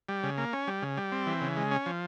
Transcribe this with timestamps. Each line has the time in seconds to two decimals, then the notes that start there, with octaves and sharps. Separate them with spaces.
0.09 G3
0.23 C#3
0.38 A#3
0.53 C#4
0.68 G3
0.82 C#3
0.97 G3
1.12 C4
1.27 E3
1.41 C#3
1.57 G#3
1.71 C#4
1.86 F3